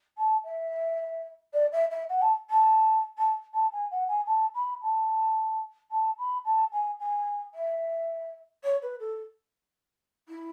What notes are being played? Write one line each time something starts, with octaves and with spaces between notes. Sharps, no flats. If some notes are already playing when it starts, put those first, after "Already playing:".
A5
E5
D5
E5
E5
F#5
A5
A5
A5
A5
G#5
F#5
G#5
A5
B5
A5
A5
B5
A5
G#5
G#5
E5
C#5
B4
A4
E4